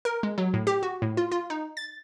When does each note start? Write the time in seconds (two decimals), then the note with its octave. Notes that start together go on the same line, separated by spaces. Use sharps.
0.05 A#4
0.23 G#3
0.38 F#3
0.54 A2
0.67 G4
0.83 F#4
1.02 A2
1.17 F4
1.32 F4
1.50 D#4
1.77 A6